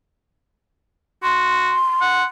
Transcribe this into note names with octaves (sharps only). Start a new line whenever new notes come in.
F#4 C6
F#5